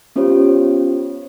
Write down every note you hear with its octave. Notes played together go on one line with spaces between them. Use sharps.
B3 C#4 F4 G4 C5 C#5